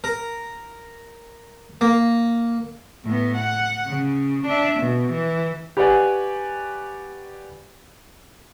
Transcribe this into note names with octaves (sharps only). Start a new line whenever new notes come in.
A#4
A#3
A2 B3
F#5
C#3
D4 E5
B2
E3
G4 B4 C#5 D5 F#5 G#5